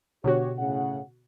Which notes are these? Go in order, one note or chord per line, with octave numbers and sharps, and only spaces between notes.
B2 D3 F#4 G4 C#5
A2 C#3 F#5